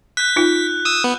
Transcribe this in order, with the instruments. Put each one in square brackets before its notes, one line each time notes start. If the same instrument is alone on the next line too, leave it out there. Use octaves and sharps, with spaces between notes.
[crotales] F#6 G6 [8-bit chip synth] B6
[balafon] D#4 F4
[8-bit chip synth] D#6 E6
B3